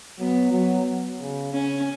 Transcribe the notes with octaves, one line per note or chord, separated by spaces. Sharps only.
F#3 B3
F#3
C#3
C#3 C#4